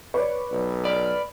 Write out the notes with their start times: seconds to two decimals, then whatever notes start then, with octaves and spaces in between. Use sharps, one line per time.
0.14 B4 C#5 D5 C#6
0.52 B1
0.85 D5 B5 F6